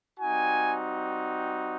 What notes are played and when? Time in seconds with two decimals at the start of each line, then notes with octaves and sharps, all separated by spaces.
0.20 G3 C4 D#4 F#4 G#5